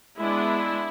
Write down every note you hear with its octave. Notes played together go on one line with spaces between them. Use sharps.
G#3 B3 D4 E4